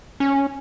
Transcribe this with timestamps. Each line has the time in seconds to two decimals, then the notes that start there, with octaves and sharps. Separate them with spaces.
0.20 C#4